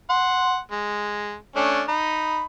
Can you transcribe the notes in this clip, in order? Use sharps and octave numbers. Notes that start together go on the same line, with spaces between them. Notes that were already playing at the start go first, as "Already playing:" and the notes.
F#5 C6
G#3
A3 C#4 D4
D#4 B5